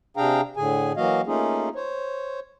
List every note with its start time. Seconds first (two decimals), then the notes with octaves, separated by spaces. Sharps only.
0.17 C3 D4 G#4 F5 G5 A#5
0.57 A2 D3 G#4 G#5
0.97 E3 F#3 A#3 F#4 D#5 F5
1.27 A3 A#3 C#4 D#4 F4 G#4
1.76 C5 C#5